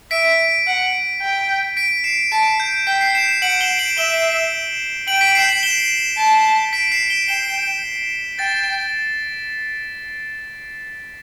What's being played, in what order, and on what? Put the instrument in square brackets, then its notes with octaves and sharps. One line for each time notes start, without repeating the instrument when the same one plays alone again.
[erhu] E5 [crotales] B6 D7
[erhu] F#5
G5
[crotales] B6 D7
C7 E7
[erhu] A5 [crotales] B6 D7
[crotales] G6
[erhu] G5 [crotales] B6
[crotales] C7
C7 E7
C7 E7
[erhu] F#5 [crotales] D7 F#7
[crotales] E7 G7
D7 F#7
[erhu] E5 [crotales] E7 G7
[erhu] G5 [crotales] D7 F#7
[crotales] B6 D7
C7 E7
D7 F#7
E7 G7
[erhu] A5
[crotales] B6 D7
C7 E7
E7 G7
[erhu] G5 [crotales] E7 G7
[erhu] G5 [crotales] A6